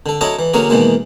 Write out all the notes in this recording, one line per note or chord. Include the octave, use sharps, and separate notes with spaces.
D3 A4
F#3 D4 E4 A4 C#5 D#5
E3
D3 F#3 A#3 C#4 F#4 G#4
B2 D#3 E3 G#3 A#3